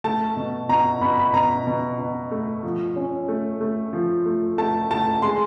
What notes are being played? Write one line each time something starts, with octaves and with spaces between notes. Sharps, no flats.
A3 A5
B2
B2 A#5
B2 B5
B5
B2 A#5
B2
B2
A3
F3
C#4
A3
A3
F3
A3
A3 A5
A3 A5
G#3 C6